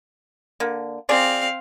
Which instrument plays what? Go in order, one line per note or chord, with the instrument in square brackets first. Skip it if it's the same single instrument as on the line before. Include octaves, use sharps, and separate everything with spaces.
[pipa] D3 A#3
[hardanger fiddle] C4 F5 [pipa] F4 G#4 D5